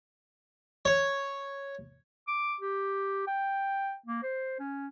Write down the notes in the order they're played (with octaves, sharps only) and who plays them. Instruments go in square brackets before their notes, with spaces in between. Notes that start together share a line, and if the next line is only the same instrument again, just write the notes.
[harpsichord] C#5
[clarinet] D6
G4
G5
A#3
C5
C#4